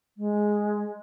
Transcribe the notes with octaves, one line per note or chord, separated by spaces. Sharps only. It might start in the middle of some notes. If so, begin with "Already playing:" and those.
G#3